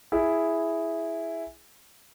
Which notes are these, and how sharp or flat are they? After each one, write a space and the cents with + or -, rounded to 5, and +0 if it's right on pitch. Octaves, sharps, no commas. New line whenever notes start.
E4 +0 G#4 +0